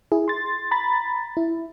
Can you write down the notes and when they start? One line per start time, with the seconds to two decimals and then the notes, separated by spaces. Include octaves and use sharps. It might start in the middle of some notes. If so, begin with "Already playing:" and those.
0.12 E4 G#4
0.28 C6 A6
0.71 A#5 B5 A6
1.37 E4